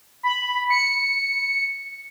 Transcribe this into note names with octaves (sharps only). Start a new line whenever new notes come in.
B5
C#7